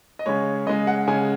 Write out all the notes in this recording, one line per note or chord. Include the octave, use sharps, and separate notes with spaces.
D#5
C#3 G#3 C#5
C#3 G#3 D#5
F#5
C#3 G#3 G#5